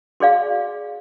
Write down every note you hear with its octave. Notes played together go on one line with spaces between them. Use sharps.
F#4 G#4 D5 F5